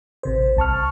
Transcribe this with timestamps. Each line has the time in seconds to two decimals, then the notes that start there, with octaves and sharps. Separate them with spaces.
0.23 A1 C3 C5
0.57 C2 A5 C#6 F6